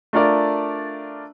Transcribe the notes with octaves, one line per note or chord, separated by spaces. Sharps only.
A3 D4 F4 A#4 D5